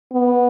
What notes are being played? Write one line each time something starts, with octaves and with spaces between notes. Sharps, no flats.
B3